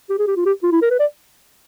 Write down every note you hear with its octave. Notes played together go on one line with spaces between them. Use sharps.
G4
G#4
G4
F4
G4
F4
E4
A#4
B4
D5